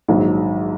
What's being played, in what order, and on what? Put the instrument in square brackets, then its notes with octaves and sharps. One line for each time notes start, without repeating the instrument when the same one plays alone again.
[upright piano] A#1 G#2 D#3 F#3